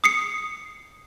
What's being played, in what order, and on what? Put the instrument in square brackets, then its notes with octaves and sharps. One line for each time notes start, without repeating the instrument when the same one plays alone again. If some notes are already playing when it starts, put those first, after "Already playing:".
[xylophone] D#6 C7 C#7